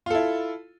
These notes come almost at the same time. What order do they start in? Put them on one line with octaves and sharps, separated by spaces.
F4 A4 E4